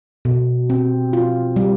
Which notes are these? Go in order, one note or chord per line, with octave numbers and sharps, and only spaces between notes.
B2
C4
F4
G3